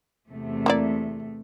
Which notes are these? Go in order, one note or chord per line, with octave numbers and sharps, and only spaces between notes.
E2 C3 A3
A#3 E4 D5